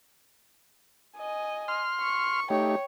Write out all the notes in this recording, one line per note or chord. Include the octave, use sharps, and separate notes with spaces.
D#5 G#5
C6 F6
C#6
A3 D#4 G4 C#5 G5